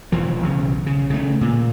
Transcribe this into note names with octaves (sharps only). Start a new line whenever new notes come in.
E1 E3 F3
B1 C#3
C#3
C#3 A3
A#2